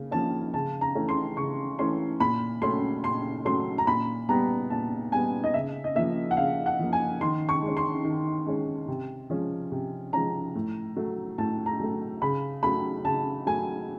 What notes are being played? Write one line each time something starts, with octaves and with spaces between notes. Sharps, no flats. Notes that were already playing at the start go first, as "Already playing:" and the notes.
Already playing: C#3 A#3 C#4
F3 A#3 C#4 A5
C#3 A5
A#5
E3 A3 C#4
C6
C#3 C#6
E3 A3 C#4 C6
A#2 B5
F#3 A3 C#4 C6
A#2 C6
F#3 A3 C#4 C6
A#5
A#2 B5
G3 B3 A#5
A#2 A5
G3 B3 G#5
D#5
C#3 E5
D#5
F3 A#3 E5
F#5
C#3 F5
F#5
F3 A#3
G#5
D#3 C6
C#6
G#3
C#4
C6
D#3
G#3 C#4
C3
F3 G#3 C#4
C3
F3 G#3 C#4 A#5
A2
F#3 A3
A2 A5
A#5
F#3 A3
C#3 B5
F#3 A3 B5
C#3 A5
F#3 A3 G#5